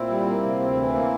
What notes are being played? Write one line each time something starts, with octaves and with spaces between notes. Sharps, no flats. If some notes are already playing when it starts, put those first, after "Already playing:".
Already playing: A#2 C4 E4
G3
A#3
C3
D2
E3
A#3